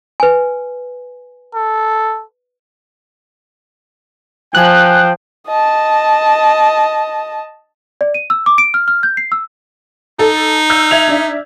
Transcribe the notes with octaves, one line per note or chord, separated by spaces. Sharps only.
B4 G#5
A4
F3 G5 G#5 F#6
D#5 A5
D5
D#7
E6
D6
D7
F6
F6
G6
C7
E6
D#4 A4
E6 F6 G6
E5 G#6 F7
D4 E5